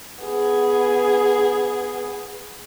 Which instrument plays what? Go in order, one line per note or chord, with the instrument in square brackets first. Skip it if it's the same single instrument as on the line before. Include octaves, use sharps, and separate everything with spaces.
[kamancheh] B3 G#4